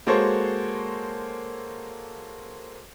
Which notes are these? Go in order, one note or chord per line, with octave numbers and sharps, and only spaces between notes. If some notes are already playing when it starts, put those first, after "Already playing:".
G#3 A#3 F#4 A4 C5 C#5